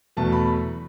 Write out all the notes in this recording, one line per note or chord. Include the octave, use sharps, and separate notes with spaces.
E2 B2 F#3 A3 A5
B5